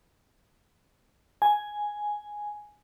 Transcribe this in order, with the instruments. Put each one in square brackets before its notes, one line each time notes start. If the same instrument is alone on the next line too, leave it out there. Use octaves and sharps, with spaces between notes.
[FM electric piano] G#5